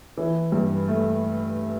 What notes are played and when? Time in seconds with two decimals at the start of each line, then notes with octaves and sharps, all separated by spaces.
0.18 E3
0.52 G2
0.88 A3